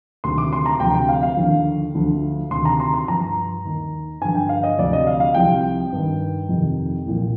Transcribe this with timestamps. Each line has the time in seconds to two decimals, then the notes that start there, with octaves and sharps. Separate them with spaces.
0.24 D2 C3 D#3 C6
0.38 D6
0.53 C6
0.66 A#5
0.80 D2 C3 F3 G5
0.94 G5
1.09 F5
1.23 F5
1.37 D#2 D3 F3
1.95 D2 D3 F3
2.50 D2 C3 D#3 C6
2.65 A#5
2.80 C6
2.94 C6
3.07 G2 F3 A#5
3.65 D#2 D#3
4.21 G2 D3 F3 G#5
4.35 G5
4.49 F5
4.63 D#5
4.78 D2 C3 F3 D5
4.93 D#5
5.07 F5
5.20 F5
5.34 C2 C3 F3 G5
5.92 G2 D#3
6.49 F2 C3 D#3
7.06 C2 A#2 F3